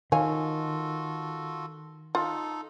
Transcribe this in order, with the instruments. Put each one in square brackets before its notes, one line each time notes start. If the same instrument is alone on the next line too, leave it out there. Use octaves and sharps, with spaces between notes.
[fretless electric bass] D#3 [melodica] F4 F#4 A4 [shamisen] C#5 F5 G#5
[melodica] D#4 A4 [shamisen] F4